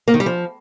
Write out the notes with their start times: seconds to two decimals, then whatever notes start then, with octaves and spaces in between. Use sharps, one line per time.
0.08 A#3
0.14 D#3
0.20 G3
0.26 F3